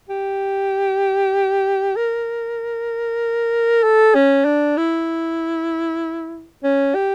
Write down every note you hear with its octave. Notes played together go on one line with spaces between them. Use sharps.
G4
A#4
A4
C#4
D4
E4
C#4
G4